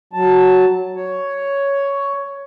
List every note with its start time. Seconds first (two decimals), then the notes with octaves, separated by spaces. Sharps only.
0.13 F#3 A5
0.96 C#5